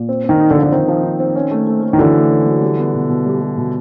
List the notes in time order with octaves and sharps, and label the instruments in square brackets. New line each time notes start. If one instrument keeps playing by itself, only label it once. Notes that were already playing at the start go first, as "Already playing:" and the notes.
Already playing: [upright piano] A#2
C4
[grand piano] D#3 [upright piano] C4
[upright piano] D#4
[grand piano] D3
[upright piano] F3
[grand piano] D3
[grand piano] D#3 [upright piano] C4
[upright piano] F3
D#4
C4
C#4
A3
A3
A3
[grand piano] D#3
[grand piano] D3 E3 [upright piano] F#4
[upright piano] A3
C#4
F#3
G3
B3
B2
B2
G3
G3
B2